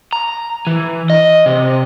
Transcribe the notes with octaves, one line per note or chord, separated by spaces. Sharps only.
A#5
E3
D#5
C3